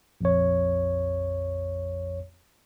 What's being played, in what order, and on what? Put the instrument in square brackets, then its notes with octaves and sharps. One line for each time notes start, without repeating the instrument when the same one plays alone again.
[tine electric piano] A#1 F2 C#5